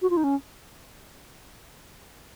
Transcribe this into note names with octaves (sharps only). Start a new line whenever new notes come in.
F#4
F4
D#4
C#4